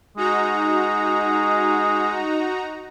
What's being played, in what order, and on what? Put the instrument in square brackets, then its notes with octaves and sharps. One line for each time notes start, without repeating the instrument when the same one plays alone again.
[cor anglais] G#3 [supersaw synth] D#4 F#4 A#5